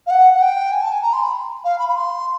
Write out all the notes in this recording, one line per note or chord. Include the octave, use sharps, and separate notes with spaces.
F5
F#5
F#5
G5
G#5
A5
G#5
A#5
C6
B5
F5
B5
B5
C6